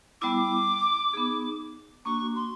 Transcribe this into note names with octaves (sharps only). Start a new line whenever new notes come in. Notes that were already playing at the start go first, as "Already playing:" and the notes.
G3 B3 E4 D6
B3 D#4 G#4
A#3 D4 F#4 C#6
C6